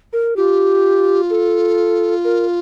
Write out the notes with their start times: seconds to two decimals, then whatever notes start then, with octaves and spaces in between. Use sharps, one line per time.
0.13 A#4
0.36 F4 G4
1.30 A4
2.24 A#4